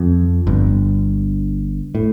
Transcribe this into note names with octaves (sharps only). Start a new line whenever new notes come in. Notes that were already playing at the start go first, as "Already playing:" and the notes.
Already playing: F2
G1 G2
A2